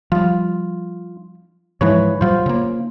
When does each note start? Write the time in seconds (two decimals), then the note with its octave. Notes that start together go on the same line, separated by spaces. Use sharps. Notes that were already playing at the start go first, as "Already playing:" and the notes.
0.12 F3 G3 F4
1.81 G#2 E3 F3 G#3 B4 C#5
2.21 A2 F#3 G3 F4 C5
2.46 C#3 A#3